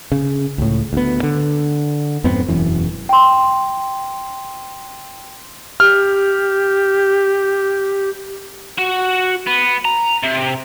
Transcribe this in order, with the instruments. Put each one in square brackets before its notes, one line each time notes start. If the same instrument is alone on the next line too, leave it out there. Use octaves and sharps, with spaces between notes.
[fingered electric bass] C#3
C#2 A2
D2 B3
D3
F2 G#2 B3 C4
E1 F#2 E3
[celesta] G5 C6
[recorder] G4 [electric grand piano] F6
[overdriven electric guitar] F#4
B3
A#5
C3